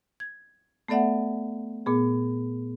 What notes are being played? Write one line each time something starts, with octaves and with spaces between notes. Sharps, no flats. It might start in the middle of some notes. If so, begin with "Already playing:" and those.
G#6
A3 B3 A4 D5 E5 F#5
A#2 B3 G#4